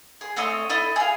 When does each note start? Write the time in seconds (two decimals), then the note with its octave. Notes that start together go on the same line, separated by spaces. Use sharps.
0.21 G#4
0.36 A3 C4 C#5 D#5
0.69 E4 A4 D#5
0.96 G#4 F5